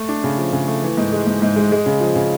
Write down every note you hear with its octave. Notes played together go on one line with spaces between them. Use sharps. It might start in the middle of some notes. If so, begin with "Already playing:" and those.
Already playing: A3
D4
C#3
F3
C#3
A3
E3
G#2
G#3
G#2
G#2
G#3
G#3
C#3
F3
C#3